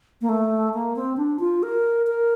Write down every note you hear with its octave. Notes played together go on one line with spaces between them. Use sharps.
A#3
A3
A#3
C4
D4
F4
A#4
A#4